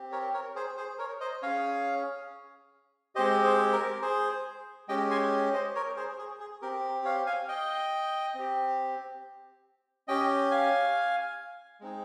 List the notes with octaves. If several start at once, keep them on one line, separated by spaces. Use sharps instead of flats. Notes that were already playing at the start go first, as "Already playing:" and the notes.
Already playing: C4 G4
A#4 C#5
A#4 C#5
G#4 C5
G#4 C5
A#4 C#5
C5 D#5
C#4 G#4 C#5 F5
G#3 C4 G4 C5 D#5
G#4 C5
A#4
G#4 C5
G#3 C#4 G4 D#5 G5
G#5 C6
C5 D#5
A#4 C#5
G#4 C5
G#4
G#4
C4 G4 A#4
C#5 F5
F5 G#5
D#5 G5
C4 G4
C#4 G4 D#5 G5
F5 G#5
G#3 C4 D#4 G#4